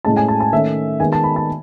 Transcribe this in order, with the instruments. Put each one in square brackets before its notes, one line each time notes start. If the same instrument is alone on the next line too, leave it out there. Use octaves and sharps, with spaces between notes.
[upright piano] A2 G#3 C#4 A5
G#5
A5
A5
D#3 A3 C#4 E5
D#3 G#3 B3 G#5
A5
B5
A5